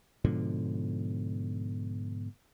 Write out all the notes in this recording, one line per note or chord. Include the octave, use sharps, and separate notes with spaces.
G#2 B2 D3 F3